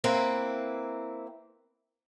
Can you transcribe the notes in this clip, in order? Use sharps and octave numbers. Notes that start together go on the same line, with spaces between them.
A#3 C4 E4 B4